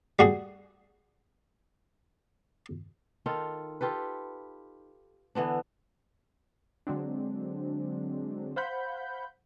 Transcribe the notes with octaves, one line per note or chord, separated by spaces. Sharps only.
G3 F#4 G#4
D#3 D#4 F4 A4
F4 G4 A4 B4
D3 E3 B3 D4
D3 F#3 G#3 C4 D4
C5 F5 F#5 B5 G6